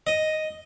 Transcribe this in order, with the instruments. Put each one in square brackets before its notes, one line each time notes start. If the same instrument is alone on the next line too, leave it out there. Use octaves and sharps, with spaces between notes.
[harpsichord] D#5